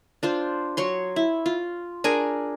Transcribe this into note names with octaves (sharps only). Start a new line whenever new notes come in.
D4 F4 C5
F#3 C#5 C6
E4
F4
D4 G#4 A#4 G#5